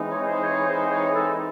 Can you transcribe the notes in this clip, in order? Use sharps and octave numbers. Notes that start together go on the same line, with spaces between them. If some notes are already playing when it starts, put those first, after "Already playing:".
Already playing: E3 G#3 C4 D#4
C#5
C5
C#5
C5
C#5
A4